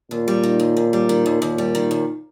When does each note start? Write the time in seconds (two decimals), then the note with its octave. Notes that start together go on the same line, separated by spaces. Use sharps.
0.11 D#2 A#2
0.28 G3
0.43 D#3
0.60 D#2
0.77 D#2
0.93 G3
1.09 D#3
1.26 D#2
1.41 D#2 A#2
1.58 G3
1.75 D#3
1.91 D#2